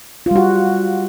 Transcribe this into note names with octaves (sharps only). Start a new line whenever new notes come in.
G3 F4 F#4